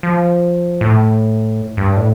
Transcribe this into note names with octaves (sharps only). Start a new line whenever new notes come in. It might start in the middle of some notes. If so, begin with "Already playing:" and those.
F3
A2
G2
A2